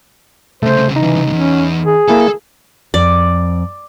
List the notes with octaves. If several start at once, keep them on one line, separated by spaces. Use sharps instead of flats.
C2 C#3 A3 C5
E3 D#4
E2 C#4
G#4
A#3 E4 A4 G#5
F2 D5